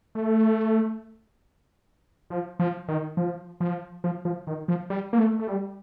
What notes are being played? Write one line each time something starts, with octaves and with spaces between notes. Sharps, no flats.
A3
F3
F3
D#3
F3
F3
F3
F3
D#3
F3
G3
A#3
A3
A3
G3